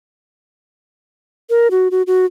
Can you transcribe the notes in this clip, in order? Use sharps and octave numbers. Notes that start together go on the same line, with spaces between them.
A#4
F#4
F#4
F#4